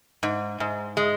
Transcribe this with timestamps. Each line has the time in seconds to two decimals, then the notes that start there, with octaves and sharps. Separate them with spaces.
0.23 G#2
0.60 G#2
0.97 G#3